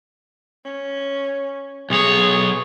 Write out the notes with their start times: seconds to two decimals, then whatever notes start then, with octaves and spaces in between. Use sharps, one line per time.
0.65 C#4
1.90 B1 G#4 C#5